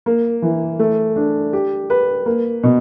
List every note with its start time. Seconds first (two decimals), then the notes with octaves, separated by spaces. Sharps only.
0.06 A#3
0.42 E3
0.79 A3
1.16 D4
1.53 G4
1.90 B4
2.26 A#3
2.63 B2